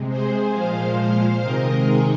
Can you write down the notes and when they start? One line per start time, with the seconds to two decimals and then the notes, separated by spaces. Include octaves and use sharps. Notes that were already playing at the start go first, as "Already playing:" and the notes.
Already playing: C3 G#3
0.09 G#4 C5
0.53 A#2 F3 G#3 C5 F5
1.41 C3 D#3 G#3 A#4 D#5
1.85 D#4 G#4